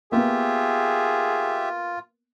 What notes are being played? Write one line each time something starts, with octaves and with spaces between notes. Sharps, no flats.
A#3 B3 F4 G4 G#4 E5